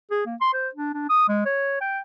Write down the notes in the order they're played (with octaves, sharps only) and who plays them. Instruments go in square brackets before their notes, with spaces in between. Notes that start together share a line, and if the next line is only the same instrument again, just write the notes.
[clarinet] G#4
A#3
C6
C5
D4
D4
D#6
G#3
C#5
G5